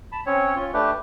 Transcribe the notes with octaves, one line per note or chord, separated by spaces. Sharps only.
A5 B5
C4 C#4 C#5
C#4 F4
A3 D4 G4 B4